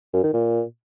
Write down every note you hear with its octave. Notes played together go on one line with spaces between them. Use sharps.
F#2
D#3
A#2